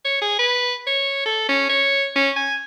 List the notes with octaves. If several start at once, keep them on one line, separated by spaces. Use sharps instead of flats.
C#5
G#4
B4
C#5
A4
C#4
C#5
C#4
G#5